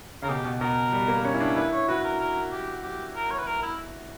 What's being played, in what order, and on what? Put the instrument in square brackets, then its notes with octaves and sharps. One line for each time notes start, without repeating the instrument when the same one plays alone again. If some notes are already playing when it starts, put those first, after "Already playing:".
[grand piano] C#3 [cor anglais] A#4
[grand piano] B2 [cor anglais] G4
[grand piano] B2
[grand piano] B2 [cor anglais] A#4
[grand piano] G3
A#3
C#4
E4
D4
[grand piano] E4 [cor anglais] B4
[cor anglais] C#5
[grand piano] F#4 [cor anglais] B4
[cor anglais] A#4
A#4
G4
G4
A#4
C#5
B4
A#4
E4